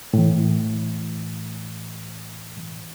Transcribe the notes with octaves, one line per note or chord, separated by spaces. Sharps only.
A2 E3